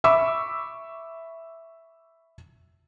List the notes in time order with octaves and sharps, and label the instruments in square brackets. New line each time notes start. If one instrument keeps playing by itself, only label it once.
[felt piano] E5 B5 C#6 D6 E6